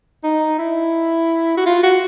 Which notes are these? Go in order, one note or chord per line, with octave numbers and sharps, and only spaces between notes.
D#4
E4
F#4
F4
F#4